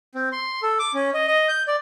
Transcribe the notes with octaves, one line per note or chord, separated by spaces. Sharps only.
C4
C6
A4
D6
C#4
D#5
D#5
G6
D5